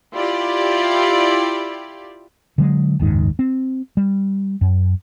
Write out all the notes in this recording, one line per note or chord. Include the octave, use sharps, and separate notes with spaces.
E4 F4 G4 D5
D3 F#3 G#3
F#1 D#2 G#2 D#3
C4
G3
F#2